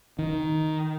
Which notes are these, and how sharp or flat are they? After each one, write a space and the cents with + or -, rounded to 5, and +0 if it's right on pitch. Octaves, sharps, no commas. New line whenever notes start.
D#3 +5